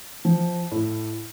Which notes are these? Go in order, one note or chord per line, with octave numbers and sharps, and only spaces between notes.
F3
A2